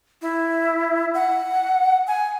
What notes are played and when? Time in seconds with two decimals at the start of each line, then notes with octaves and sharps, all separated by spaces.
0.22 E4
1.14 F#5
2.07 G#5